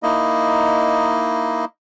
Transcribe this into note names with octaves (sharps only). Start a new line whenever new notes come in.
A#3 D#4 E4 D#5